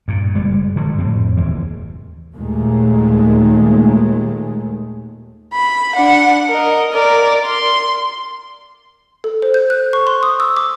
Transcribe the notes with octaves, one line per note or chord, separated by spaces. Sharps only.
G2 A#2
F#1 G3 G#3
D3 D#3 F#3 G#3
F2 A2 C4
F#1 D#2 E3
D#2 A#2 D#3 G#3 A3
B5
D4 F#5
A#4 D#5
A#4 D5
C6
A4
C5
G6
F#6
C#6
C6
D#6
E6
D6